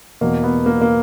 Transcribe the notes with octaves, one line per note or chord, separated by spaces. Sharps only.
E2 B2 A#3
B3
A#3
A#3